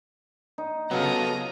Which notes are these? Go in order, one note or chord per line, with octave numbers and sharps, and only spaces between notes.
D#4
C#3 F3 F#3 B3 A4 A#5 D#6